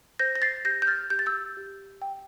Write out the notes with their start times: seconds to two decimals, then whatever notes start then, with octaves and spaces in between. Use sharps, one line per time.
0.19 C5 G6 A#6
0.36 A#6
0.42 A6 C7
0.65 G4 G6 A#6
0.82 G6
0.87 F6 A6
1.10 G4 G6
1.19 A6
1.26 E6 G6
1.57 G4
2.02 G5